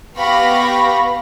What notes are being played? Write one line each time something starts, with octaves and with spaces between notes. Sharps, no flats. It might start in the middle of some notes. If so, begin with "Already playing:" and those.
B3 G4 F5 B5 C#6 A#6